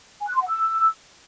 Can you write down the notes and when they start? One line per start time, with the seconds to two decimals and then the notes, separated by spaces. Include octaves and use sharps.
0.21 G#5
0.28 F#6
0.35 C6
0.41 F#5
0.48 E6